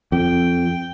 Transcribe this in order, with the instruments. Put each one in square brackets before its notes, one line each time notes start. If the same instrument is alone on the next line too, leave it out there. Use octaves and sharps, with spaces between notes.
[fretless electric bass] F2 [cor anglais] G5